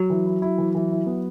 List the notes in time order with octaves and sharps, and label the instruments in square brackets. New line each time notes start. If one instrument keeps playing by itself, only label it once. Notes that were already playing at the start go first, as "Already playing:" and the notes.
Already playing: [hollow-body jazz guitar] F#3
[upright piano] E3
E4
E4
E3
E3
E4
B3